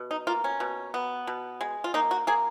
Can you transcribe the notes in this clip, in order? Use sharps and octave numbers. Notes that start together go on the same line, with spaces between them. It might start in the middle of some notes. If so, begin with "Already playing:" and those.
Already playing: B2
D#4
A#3 F4
C#4
B2
B3
B2
G#3
F4
A#3 D#4
F#4
A#3 G#4